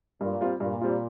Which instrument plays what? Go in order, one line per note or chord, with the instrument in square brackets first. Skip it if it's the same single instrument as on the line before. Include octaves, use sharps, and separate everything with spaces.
[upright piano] G2 [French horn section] A#2
[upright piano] G3 C4 F4
[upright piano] G2 [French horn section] A#2
[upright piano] G3 C4 F4